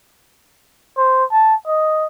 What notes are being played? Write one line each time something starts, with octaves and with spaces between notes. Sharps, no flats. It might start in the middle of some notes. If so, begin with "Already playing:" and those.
C5
A5
D#5